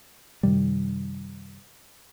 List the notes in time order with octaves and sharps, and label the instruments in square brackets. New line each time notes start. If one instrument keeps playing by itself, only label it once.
[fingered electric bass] F#2 C3 D#3 G3